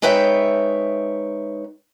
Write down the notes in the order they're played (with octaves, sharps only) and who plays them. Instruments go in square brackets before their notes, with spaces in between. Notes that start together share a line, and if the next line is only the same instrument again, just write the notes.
[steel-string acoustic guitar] G#3 D#4 B4 C#5 E5 G5